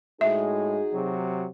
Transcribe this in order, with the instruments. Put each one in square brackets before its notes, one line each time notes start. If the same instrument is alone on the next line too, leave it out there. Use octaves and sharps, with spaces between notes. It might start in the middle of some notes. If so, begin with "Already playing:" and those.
[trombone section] A2 G#3 [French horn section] D#4 F#4 G#4 [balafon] E5
[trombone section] C3 F#3